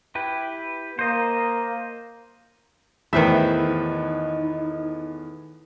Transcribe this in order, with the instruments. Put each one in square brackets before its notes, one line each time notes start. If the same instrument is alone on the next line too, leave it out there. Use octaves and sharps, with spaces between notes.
[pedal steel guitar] E4 G4 B4
[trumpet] A#3 [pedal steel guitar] C5 D#5
[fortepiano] E2 A2 B4 [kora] D#3 C5 E5
[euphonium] D#4